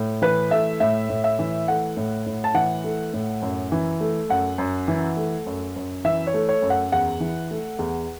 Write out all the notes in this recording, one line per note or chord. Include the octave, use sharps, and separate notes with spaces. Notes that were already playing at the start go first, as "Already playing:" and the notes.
Already playing: A2
E3 B4
A3 E5
A2 E5
A2
E5
E3
A3 F#5
A2
A2
A5
E3 F#5
A3
A2
F#2
E3
A3
F#2 F#5
F#2
E3
A3
F#2
F#2
E3 E5
C#5
A3
C#5
F#2
F#5
E2 F#5
E3
A3
E2